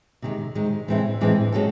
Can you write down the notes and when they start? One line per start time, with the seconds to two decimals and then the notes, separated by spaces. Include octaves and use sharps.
0.22 C3 D#3 G#3
0.55 C3 D#3 G#3
0.88 A2 E3 G#3 C4 E4
1.21 A2 E3 G#3 C4 E4
1.52 G#3 C#4 F#4 A4